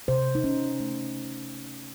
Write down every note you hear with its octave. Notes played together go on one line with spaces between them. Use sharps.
C3 C5
D#4
C3 C#4
A3